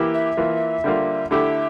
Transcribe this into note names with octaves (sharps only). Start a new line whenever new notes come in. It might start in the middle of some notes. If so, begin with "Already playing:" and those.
Already playing: E3 A#3 E4 G4
E5
E3 A#3 F4
D3 G3 A#3 F4
D3 A3 E4 G4 E5